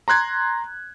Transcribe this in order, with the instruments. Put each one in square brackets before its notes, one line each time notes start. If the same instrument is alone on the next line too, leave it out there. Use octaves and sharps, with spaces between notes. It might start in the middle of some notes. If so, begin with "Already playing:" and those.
[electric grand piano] A#5 C6 F#6 G#6